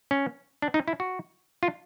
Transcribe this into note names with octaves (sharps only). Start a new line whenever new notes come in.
C#4
D4
D#4
E4
F#4
F4